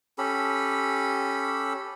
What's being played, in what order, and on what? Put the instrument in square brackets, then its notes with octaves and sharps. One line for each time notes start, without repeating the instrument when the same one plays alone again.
[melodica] C#4 G4 A4 B5